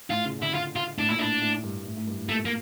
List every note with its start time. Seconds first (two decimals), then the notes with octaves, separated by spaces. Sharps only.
0.10 A2 F4
0.25 C#3
0.39 D3 E4
0.54 F4
0.76 F4
0.98 A2 D4
1.09 A#2 E4
1.19 A2 D4
1.42 A2
1.63 G2
1.85 A2
1.97 A2
2.07 G2
2.18 A2
2.29 A#2 A3
2.45 A#3